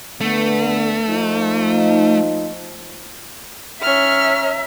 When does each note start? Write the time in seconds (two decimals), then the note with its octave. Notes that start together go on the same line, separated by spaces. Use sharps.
0.21 D3 A3 B3
1.07 F3 D#4
3.82 C#4 E5 A#5 F6